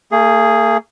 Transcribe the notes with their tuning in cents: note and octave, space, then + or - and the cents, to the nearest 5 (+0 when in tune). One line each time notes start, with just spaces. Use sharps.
A#3 -45 G#4 +0